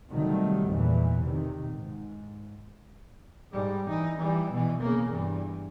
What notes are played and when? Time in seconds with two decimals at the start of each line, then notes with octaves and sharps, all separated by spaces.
0.11 C3 D#3 F#3 G3 A3
0.71 E2 A#2 E3
1.23 C3 D#3
1.71 G#2
3.52 G#2 G3
3.88 E3 D#4
4.18 E3 G3
4.52 B2 E3
4.81 C#3 A#3
5.10 G2 E3